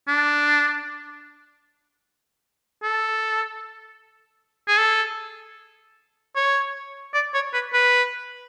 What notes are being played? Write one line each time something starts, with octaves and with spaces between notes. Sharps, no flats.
D4
A4
G#4
A4
C#5
D5
C#5
B4
B4